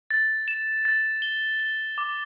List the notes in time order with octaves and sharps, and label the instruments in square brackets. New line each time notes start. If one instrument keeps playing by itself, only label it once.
[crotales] A6
E7
A6
G7
G7
D6